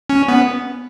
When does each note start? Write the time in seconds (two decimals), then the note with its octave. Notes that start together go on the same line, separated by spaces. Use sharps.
0.10 C#4
0.28 B3